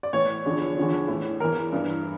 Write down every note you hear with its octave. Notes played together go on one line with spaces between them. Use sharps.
D5
A2 E3 C#5
E2 D3 F3
E2 D3 F3
A2 E3
E2 E3 A#4
G2 E3